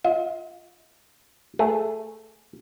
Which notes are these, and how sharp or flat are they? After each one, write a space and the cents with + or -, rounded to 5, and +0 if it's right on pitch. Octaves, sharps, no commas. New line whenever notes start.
F4 +0 D#5 +45
A3 +0 G#4 +0